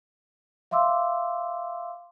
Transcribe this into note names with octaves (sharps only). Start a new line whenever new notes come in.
E5 F5 C6 D6 E6